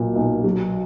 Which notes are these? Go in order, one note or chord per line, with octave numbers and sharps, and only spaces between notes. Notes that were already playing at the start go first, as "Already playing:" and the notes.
Already playing: B1 A#2 F#3
B1
F#3